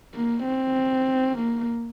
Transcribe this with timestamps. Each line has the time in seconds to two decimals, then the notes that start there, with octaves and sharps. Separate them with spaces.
0.15 A#3
0.45 C4
1.38 A#3